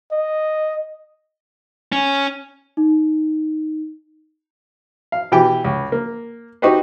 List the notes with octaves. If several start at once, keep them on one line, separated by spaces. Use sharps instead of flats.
D#5
C#4
D#4
F5
B2 E3 G4 G5
C#2
A#3
D#4 F#4 G4 B4 C5